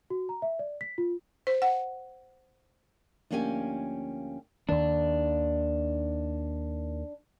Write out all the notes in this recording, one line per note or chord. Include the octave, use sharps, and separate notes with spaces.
F#4
A#5
E5
D5
B6
F4
C5
F#5
D2 F3 A#3 C#4 G4 G#5
D#2 D#3 D4